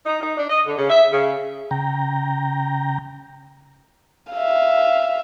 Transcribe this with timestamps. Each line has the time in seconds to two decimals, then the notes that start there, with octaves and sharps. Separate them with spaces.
0.05 D#4
0.20 D#4
0.36 D4
0.49 D#5
0.66 D3
0.78 C#3
0.90 E5
1.11 C#3
1.71 C#3 G5 A#5
4.33 E5 F5